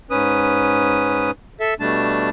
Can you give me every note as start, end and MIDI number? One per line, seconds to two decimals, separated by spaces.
0.11 1.31 44
0.11 1.31 61
0.11 1.31 71
0.11 1.31 87
1.60 1.74 69
1.60 1.74 76
1.80 2.30 47
1.80 2.30 55
1.80 2.30 57
1.80 2.30 62
1.80 2.30 81